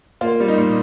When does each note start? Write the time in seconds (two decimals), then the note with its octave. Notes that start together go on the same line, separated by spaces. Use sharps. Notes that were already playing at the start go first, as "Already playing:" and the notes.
0.21 A#3 F4
0.40 G3
0.48 D#4
0.58 A#2